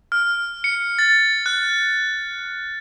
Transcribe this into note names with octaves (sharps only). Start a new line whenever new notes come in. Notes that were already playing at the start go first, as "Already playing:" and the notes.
F6
C#7
A6
F#6